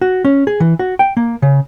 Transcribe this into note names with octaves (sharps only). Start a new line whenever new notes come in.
F#4
C#4
G#4
E3
F#4
G5
A#3
C#3